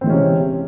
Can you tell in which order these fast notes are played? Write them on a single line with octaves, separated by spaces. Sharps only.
C4 E3 G#3 C#4 C3